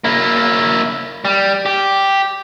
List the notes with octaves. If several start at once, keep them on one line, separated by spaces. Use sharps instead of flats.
A#3 E4
G3
G4